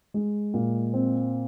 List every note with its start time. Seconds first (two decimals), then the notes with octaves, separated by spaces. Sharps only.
0.14 G#3
0.54 A#2
0.93 C4